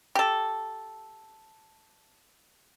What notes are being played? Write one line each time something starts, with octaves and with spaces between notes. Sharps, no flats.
G4 A4